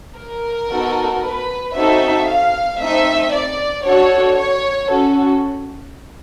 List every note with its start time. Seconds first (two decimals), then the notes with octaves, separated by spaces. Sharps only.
0.17 A#4
0.70 B3 D#4 F#4 A4
1.22 B4
1.74 C4 D#4 F#4 A4 E5
2.27 F5
2.79 A3 C4 D#4 E5
3.32 D5
3.84 D4 F#4 A4 C#5
4.37 C#5
4.89 C#4 F#4 A4